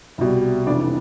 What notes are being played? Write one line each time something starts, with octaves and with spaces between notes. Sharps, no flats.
C2 B2 G3
F1 F2 E3 D4 D5